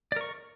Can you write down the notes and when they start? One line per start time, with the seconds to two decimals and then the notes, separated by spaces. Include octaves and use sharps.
0.12 D5
0.16 A#4
0.21 C#6